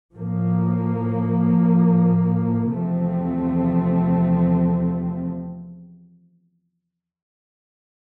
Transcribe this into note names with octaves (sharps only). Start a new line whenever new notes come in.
A2 F3 A#3
E2 C3 F3 A3 C4